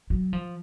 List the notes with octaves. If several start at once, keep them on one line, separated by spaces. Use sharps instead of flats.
F#3
F3